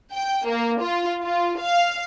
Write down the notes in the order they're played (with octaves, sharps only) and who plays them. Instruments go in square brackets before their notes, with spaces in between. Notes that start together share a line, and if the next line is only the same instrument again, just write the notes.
[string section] G5
A#3
F4
F4
F5